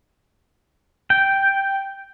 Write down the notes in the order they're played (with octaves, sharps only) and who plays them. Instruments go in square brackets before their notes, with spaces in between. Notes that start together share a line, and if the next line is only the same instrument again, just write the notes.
[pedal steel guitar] G5